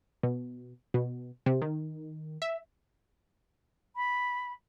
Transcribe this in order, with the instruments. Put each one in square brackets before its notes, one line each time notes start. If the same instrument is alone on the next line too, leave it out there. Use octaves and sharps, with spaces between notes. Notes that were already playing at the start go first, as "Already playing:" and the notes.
[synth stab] B2
B2
C3
D#3
E5
[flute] B5